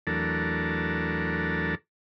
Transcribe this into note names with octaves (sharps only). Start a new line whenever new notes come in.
E2 F#3 A3 D4 A4 A#4